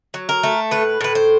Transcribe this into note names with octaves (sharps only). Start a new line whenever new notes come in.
F#3
A#4
A3
A2 B4
A2 B4
C5